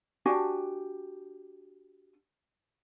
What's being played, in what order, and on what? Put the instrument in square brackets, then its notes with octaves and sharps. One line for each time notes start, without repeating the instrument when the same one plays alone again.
[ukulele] D4 F#4 G4 G#5